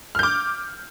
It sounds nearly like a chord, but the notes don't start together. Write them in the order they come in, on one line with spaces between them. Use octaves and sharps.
F6 G6 D6